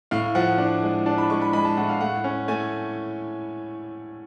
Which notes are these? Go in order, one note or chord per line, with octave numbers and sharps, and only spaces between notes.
A2 F5
F3 F#5
D4
G#3
D4 A5
B5
G#3 C#6
B5
G#3 B5
A5
A2 F#5
F5
A3 F#5
C#4
A3 G#5